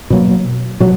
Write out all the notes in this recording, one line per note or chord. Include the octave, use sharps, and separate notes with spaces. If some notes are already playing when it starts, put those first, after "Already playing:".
B2 F#3 A#3
B2 F#3